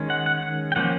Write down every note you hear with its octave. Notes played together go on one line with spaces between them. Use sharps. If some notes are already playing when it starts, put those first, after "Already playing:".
Already playing: D#3 G#3 C#4
F#5
F#5
F#5
G5
F3 A#3 C#4 F#5